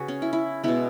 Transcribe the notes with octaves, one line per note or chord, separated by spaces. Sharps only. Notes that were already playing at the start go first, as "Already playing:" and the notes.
Already playing: C#3 F#4 G#4 B4
C#4
E4
E4
B2 G#3 B3 E4